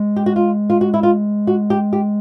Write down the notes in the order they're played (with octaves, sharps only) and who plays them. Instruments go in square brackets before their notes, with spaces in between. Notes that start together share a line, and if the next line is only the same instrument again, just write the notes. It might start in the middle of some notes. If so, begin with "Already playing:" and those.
Already playing: [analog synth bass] G#3
[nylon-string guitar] G4
F#4
F4
F4
F#4
E4
F4
F#4
G4
G4